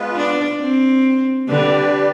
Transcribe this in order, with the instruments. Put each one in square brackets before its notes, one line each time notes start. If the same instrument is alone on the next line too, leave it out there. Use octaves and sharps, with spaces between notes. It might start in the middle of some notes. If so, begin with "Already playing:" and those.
Already playing: [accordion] G#3 B3 F4 B4
[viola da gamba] D4
C4
[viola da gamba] D3 [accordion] G3 D4 G4 B4 D5